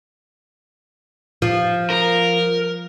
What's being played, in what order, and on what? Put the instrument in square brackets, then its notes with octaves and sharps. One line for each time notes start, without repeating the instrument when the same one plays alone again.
[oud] F3
[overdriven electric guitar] A#4